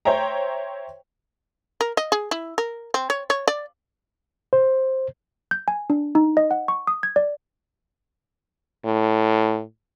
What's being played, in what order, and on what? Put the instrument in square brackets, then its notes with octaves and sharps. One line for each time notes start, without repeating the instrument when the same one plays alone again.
[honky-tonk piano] C5 C#5 E5 G5 A#5
[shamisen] A#4
D#5
G#4
E4
A#4
C4
C#5
C#5
D5
[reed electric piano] C5
[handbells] G6
G#5
D4
D#4
D#5
F#5
C#6
D#6
G#6
D5
[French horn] A2